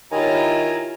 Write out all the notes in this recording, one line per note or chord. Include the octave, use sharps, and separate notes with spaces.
D#3 E4 F4 G4 C#5 G#5 A#5 B5